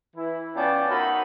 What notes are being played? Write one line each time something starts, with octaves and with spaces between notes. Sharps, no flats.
E3 E4
B3 C#4 F4 D5 G5 A5
D#4 F#4 A#4 C#5 E5 B5